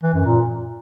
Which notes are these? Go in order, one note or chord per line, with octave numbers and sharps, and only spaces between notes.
E3
F#2
A#2